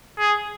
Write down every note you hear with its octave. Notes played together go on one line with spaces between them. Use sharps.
G#4